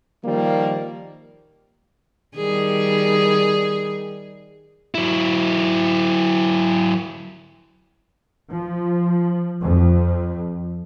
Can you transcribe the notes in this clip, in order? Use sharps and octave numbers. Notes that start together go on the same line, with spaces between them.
D#3 F3 G3 A#3
D#3 G3 G#4
F#3 E4
F3
F2